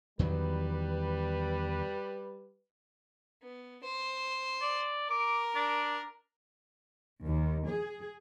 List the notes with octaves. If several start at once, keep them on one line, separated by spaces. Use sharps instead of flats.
E2 D#3 F#3 G3 B4
B3
C5
D5
A#4 D6
D4
D#2
G#4